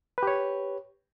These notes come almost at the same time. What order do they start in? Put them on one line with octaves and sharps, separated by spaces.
B4 G4 C#5